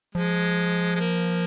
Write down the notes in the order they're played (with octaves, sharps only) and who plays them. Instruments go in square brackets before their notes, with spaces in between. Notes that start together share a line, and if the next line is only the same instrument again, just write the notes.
[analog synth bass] F3 [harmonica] G#3
[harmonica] G#3
A#3